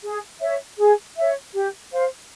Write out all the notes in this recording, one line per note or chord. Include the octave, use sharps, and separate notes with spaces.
G#4
C#5 E5
G#4
C#5 E5
G4
C5 F5